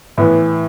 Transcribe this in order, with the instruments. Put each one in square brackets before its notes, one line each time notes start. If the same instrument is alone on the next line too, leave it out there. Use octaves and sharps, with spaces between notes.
[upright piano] A2 E3 B3